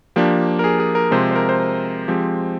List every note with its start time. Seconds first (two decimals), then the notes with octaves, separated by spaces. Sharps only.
0.16 F3 A#3 D4 G4
0.59 A#4
0.64 G#4
0.80 G#4
0.95 A#4
1.11 C3 F3 G#3 C5
1.31 C5
1.35 A#4
1.49 C5
1.59 A#4
2.08 F3 G#3 C4 G4